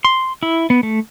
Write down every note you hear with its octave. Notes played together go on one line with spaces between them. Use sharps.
C6
E4
B3
A3